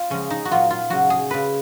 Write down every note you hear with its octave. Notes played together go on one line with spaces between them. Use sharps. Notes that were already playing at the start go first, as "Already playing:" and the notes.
Already playing: F4
C#3 F3 G#3 C#4
D#4
F#4
A#2 F#3 F4
F4
C#3 F#3 F#4
G#4
C#3 G#3 B4